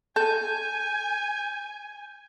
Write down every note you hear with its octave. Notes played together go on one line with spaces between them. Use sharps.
A4 G#5 G6